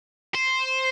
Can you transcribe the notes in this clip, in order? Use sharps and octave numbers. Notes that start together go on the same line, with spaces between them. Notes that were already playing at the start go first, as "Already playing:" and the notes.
C5